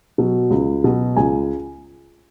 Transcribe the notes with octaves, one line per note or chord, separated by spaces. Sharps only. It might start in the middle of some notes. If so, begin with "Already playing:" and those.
B2 F#3
C#2
B2 F#3
C#2 G#5